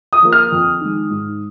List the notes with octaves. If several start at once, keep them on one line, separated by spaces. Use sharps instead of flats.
D#6
F3 A#3
F6
F2
D#3 G#3
G#2